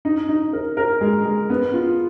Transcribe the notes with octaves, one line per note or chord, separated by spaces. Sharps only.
D#4
D#4
A#4
A#4
G#3
G#3
B3
F4